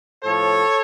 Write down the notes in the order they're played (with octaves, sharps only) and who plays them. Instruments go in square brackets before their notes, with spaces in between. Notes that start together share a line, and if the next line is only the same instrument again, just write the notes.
[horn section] A2 F3 A4 C#5